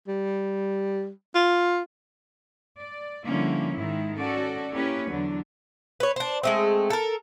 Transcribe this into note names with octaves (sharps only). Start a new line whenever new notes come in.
G3
F4
D5
D3 F3 G3 A#3 C#4 E4
G#2 D#3 G#3 E4
C#4 F#4 A4 D5
A#3 C#4 E4 G4 B4 C#5
E2 D3 F#3 D4
B4 C#5
D4 C5
G#3 A3 C4
A4 A#4